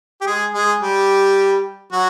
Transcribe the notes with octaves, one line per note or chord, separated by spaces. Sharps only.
G4
G#3 G#4
G#3 G#4
G3 G4
F#3 F#4